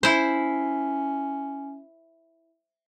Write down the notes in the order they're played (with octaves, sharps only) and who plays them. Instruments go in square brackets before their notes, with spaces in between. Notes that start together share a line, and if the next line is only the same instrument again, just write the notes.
[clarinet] C#4 [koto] E4 C5